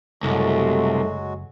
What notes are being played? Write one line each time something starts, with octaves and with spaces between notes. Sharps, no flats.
F#1 C2 F#3 G#3 A3 F#4